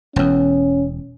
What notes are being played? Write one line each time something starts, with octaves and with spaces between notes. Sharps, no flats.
E1 E2 C#4